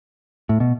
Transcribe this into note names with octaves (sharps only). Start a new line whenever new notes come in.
A2
B2